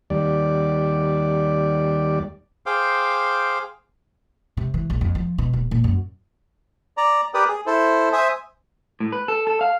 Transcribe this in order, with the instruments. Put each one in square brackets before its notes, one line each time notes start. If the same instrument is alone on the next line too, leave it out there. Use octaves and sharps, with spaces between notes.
[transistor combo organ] D#2 G3 D5
[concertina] G#4 C5 F5 G5 D6
[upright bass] C3
E3
A#1
F2
F3
B2
D#1
A#2
F#2
[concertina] D5 A#5
G4 A#4 B4 D5 G5 D#6
G#4
E4 A4 C5
C5 E5 G#5 D#6
[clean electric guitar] A2
B4
A4
A4
F5